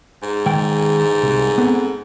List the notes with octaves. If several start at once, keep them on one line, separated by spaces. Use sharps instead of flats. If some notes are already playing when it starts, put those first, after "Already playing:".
G#2
D#3 G#3 G5
C2
B3 C4 A4